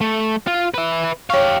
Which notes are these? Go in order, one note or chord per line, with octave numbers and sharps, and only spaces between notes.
A3
F4
B4 E5
G4 C#5 F5 C#6